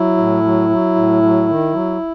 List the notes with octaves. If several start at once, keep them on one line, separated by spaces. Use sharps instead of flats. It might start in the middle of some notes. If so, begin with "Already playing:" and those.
Already playing: F#3 E4
A2
F#3
F#3
A2
F#3
D#3
F#3